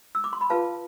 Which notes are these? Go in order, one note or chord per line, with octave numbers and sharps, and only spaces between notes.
E6
D6
C6
B5
F4 B4 F5 A5